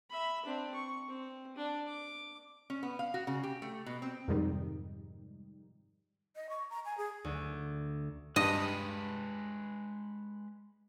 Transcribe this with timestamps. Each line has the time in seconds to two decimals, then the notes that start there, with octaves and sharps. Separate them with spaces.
0.10 E5 B5
0.45 C4 D4
0.74 C#6
1.08 C4
1.56 D4
1.87 D6
2.70 C#4
2.83 B3
2.99 F5
3.14 F#4
3.27 C#3
3.43 G4
3.62 A3
3.86 B2
4.02 C4
4.28 F2 G#2 C3 D#3 G3 D#4
6.36 D#5
6.50 C#6
6.70 A#5
6.85 G#5
6.98 G#4
7.24 D2
8.36 G2 G#3 B4 D#5